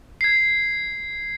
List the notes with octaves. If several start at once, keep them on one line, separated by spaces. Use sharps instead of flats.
G#6 C7